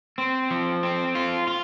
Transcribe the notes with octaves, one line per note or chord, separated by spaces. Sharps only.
C4
F3
C4
F4
F4